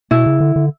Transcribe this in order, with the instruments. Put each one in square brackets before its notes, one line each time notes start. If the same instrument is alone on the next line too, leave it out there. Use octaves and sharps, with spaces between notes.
[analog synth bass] B2 [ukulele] E4
[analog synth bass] C#3
D3
D3